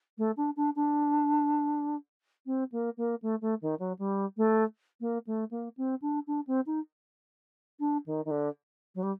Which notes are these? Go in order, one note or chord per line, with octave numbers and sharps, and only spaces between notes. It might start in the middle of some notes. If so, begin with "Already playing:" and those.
A3
D4
D4
D4
C4
A#3
A#3
A3
A3
D#3
F#3
G3
A3
A#3
A3
A#3
C4
D4
D4
C4
D#4
D4
D#3
D#3
D3
F#3
G3